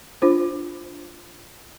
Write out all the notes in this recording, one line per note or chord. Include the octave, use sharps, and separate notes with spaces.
D4 F4 C5